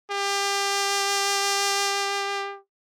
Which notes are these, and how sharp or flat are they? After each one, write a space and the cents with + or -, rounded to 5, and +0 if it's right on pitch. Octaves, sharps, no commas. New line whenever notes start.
G4 +30